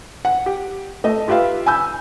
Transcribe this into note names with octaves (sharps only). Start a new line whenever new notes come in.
F#5
G4
A3 D#5
F4 G4 B4 E5 F5
G#5 B5 E6 G6